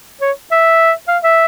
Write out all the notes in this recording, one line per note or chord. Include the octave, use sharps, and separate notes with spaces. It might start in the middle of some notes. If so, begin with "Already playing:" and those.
C#5
E5
F5
E5